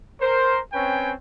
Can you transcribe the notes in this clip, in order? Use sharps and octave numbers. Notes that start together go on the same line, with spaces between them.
A#4 C5
C4 C#4 B4 C#5 G5 G#5